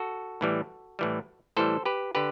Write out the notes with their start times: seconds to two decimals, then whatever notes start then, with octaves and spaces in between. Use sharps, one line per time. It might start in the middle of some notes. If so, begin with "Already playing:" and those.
Already playing: F#4 A4
0.41 A2 E3 G3
0.99 A2 E3 G3
1.57 A2 E3 G3 A4 C5
1.85 G4 B4
2.15 D3 G4 B4